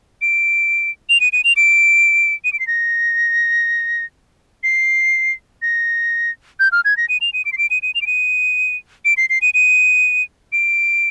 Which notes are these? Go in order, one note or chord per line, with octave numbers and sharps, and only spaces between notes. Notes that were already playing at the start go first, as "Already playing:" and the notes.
D7
F7
D#7
D#7
F7
D7
D#7
D7
C7
A#6
C7
A#6
G6
F6
G#6
A#6
D#7
F7
D#7
D7
C7
D7
D#7
D#7
F7
D7
D#7
D7
C7
C7
D#7
D#7
D7